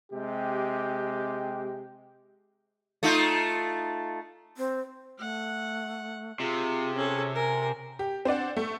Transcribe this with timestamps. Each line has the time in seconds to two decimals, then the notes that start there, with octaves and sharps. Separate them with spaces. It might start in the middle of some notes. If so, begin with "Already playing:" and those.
0.12 C3 G#3 G4
3.03 A3 D#4 F4
4.57 C4
5.19 A3 F#5
6.39 C3 F4 G#4
6.96 C#4 A4
7.35 A#4 G#5
7.99 G4
8.25 C4 D4 D5 F#5
8.57 A3